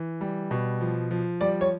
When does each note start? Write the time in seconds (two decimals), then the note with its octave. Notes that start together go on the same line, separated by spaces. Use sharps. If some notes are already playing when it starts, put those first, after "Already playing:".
Already playing: E3
0.21 G3
0.51 B2
0.81 F3
1.11 F3
1.41 G3 D5
1.61 C#5